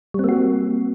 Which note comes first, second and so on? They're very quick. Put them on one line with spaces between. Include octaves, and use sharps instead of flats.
G3 C4 A#3 F#4